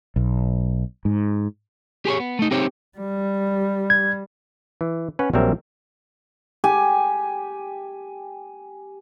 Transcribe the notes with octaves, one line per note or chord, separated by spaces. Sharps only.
B1
G#2
G4 G#4 C5 C#5
B3
A3 D#4
C4 D#4 G4 C5 C#5
G3
G#6
E3
C#4 B4 C#5 F#5
A#1 F#3 G3 C4 A#4 E5
G4 G#5